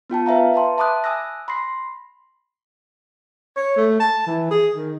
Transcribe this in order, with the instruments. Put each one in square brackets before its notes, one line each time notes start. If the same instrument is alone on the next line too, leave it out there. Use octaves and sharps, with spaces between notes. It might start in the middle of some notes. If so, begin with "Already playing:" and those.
[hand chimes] B3 F4 G5 A5
B4 E5 F5 A#5
B4 G5 A5 C6
E5 A5 B5 D6 D#6 F#6
G#5 D#6 E6 F#6 A#6
B5 C6 A#6 C7
[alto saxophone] C#5
A3
A5
E3
G#4
D#3